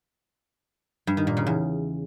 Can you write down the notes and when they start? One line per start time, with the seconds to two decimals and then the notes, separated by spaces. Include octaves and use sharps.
1.07 G2
1.17 D#3
1.27 A#2
1.37 C#3
1.47 E2